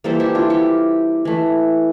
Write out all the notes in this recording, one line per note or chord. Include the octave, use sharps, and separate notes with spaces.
E3 G3 A#3 A4 C5
E4 G4
D4 F4
E4 G4
E3 A3